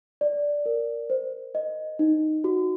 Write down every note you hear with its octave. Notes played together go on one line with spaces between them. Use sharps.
D5
A#4
C5
D#5
D#4
F#4